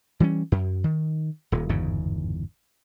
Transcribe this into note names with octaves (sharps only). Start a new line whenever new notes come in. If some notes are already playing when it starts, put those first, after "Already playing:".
E3 G3 A3 C#4
F#2
D#3
D#1 A#2
G1 E2 G#2 C#3